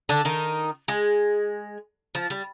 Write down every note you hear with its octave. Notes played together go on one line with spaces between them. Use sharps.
D3 D4
D#3 D#4
G#3
F3
G3